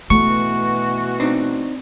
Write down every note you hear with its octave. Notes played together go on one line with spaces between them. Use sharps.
B2 E3 A3 F#4 C#6
C4 D4 D#4